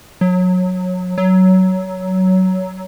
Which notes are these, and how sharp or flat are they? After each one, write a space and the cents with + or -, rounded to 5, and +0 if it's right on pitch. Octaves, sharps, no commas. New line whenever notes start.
F#3 -20
F#3 +15